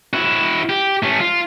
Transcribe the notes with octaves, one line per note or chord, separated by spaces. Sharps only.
E4 F#4
G4
A3 C#4
F4